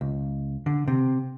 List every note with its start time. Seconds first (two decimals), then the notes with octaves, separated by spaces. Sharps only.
0.01 C#2
0.66 D3
0.88 C3